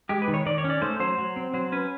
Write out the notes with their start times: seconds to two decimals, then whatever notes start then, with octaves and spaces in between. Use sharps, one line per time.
0.09 G#3 G4
0.22 B4
0.28 D#3
0.34 C#5
0.46 D#3 D5
0.58 C#5
0.64 C#4
0.70 D5
0.82 A3 C5
1.00 F#3 C5
1.18 F#3
1.36 C4
1.54 F#3 C5
1.72 C#4 B4